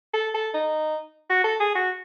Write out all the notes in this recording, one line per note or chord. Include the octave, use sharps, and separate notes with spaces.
A4
A4
D#4
F#4
A4
G#4
F#4